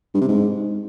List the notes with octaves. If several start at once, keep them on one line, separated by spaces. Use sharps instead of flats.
G2
C3
G#2